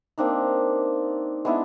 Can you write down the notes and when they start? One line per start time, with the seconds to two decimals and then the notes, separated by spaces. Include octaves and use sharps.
0.18 A#3 C4 D4 D#4
1.45 G#3 B3 D4 E4